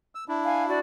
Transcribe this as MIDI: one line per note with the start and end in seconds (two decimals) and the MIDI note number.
0.15 0.24 88
0.28 0.79 62
0.28 0.79 64
0.44 0.65 77
0.44 0.65 80
0.68 0.80 66
0.68 0.80 74